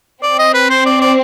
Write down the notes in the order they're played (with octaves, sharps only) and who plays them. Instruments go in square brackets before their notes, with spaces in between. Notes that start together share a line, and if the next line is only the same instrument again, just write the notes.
[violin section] C4 [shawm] D5
[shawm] D#5
B4
C5
D5
D5